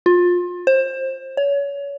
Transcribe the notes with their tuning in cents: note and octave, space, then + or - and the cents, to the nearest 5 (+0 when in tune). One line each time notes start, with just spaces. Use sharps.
F4 +25
C5 +25
C#5 +30